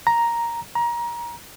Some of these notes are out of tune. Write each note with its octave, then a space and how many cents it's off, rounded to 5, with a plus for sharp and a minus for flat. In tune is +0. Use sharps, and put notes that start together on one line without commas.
A#5 +5
A#5 +25